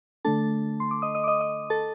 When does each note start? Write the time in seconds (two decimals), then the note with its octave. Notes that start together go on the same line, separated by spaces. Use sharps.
0.25 D3 A3 D4 A4 A5
0.80 C6
0.91 D6
1.02 D#5 D#6
1.15 D#5 D#6
1.24 D6
1.28 D#5 D#6
1.41 D#5 D#6
1.70 A4 A5